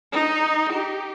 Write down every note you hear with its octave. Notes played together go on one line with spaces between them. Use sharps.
D#4
G4